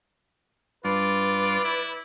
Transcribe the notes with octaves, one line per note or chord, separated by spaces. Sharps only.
G2 F4 B4 D5
E4